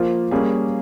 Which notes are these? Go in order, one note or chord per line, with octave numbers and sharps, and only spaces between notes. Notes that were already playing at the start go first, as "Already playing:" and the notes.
Already playing: F3 A#3 F4
G3 A#3 C#4 G#4